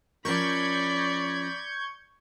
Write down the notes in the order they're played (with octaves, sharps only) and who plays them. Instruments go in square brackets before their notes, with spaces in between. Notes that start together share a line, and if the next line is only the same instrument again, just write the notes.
[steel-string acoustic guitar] F3 C#4 A#4 [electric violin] D5 B5 [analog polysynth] C#6 G6 G#6